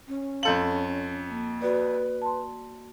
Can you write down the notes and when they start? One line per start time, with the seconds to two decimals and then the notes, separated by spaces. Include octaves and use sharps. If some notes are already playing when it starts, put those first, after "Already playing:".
0.08 C#4
0.43 F2 A4 F5 C6 G6 F#7
1.30 A#3
1.62 F#4 B4 D5
2.22 A5 C6